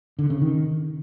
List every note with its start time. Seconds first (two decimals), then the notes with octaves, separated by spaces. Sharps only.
0.19 D3
0.30 C#3
0.41 D#3